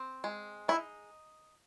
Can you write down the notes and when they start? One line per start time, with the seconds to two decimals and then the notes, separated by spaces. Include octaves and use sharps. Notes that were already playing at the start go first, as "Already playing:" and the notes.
Already playing: C4
0.24 G#3
0.68 D#4 E4